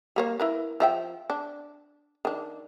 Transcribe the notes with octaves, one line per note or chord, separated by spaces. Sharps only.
G3 A#3 C#5
E4 A#4 B4
F3 E5 G5
D4
D#3 D4